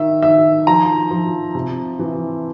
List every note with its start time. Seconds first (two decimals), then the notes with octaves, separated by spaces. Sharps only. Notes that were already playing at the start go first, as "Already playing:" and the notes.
Already playing: D#3 E5
0.23 D#3 E5
0.67 F3 A#5
1.11 F3
1.55 C3
1.99 E3